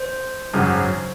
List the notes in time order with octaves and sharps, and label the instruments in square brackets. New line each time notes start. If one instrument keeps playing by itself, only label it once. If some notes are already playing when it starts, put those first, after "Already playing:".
Already playing: [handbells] C5
[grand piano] G#1 F#2 C#3 F#3